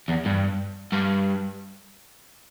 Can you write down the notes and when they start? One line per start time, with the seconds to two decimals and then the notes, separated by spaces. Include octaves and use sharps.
0.08 E2
0.25 G2
0.92 G2